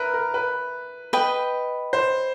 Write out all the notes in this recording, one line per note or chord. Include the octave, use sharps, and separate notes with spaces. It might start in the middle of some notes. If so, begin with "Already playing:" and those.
Already playing: A#4 B4 E5
A#4
B4
B4 D#5 G5
C5